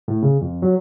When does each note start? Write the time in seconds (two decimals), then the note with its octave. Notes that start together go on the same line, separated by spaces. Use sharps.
0.08 A2
0.22 C#3
0.41 F2
0.62 F#3